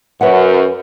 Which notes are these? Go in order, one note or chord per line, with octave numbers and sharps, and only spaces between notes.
F#2 B4 F#5